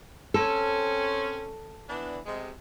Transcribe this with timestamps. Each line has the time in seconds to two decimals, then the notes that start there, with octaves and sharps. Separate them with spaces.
0.34 C4 C#4 A4
1.88 E3 B3 D4
2.25 C3 G#3